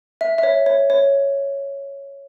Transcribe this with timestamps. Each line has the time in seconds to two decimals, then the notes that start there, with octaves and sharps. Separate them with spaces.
0.21 E5
0.38 E5
0.43 C#5
0.66 C#5
0.90 C#5